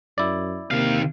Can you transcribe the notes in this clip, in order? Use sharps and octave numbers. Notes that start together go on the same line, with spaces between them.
F#2 E4 D5
C3 D#3 A#3 F5